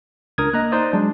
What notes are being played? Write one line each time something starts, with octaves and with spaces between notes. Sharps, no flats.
C#2 D4 A#4 D#6 G#6
A#3 D#5 A#5 F#6
D#4 C5 D5 D#6
F#3 G#3 D4